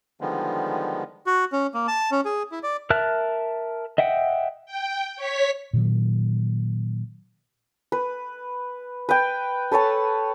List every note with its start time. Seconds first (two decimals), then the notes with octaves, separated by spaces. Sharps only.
0.21 D3 D#3 F3 G3 G#3 B3
1.26 F#4
1.52 C#4
1.74 A#3
1.88 A5
2.11 C#4
2.25 G#4
2.52 E4
2.63 D5
2.90 A#4 E5 A5 F6 F#6
3.98 D#5 E5 F#5 G5
4.66 G5
5.16 C#5 B6
5.73 A#2 D#3 F#3
7.92 B4
9.09 B4 G5
9.72 A4 B4 C#5 A5